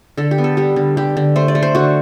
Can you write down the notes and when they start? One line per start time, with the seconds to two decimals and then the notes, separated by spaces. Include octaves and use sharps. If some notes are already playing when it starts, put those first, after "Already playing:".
0.17 D3 A4
0.31 G4
0.38 B3
0.44 A4
0.57 G3 G4
0.76 D3
0.97 D3 G4
1.17 D3
1.36 A3 C5
1.48 D5
1.55 A3
1.63 C5
1.75 D3 F#4